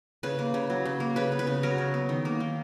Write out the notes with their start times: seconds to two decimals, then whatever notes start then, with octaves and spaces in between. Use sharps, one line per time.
0.23 C#3 B4
0.39 A#3
0.54 C#3
0.70 F#3
0.85 C#3
1.00 A#3
1.16 C#3 B4
1.32 B3
1.39 B4
1.47 C#3
1.63 F#3 A#4
1.78 C#3
1.94 B3
2.09 D#3
2.25 A#3
2.40 D#3